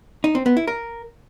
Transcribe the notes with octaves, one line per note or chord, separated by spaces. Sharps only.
D#4
C4
B3
E4
A#4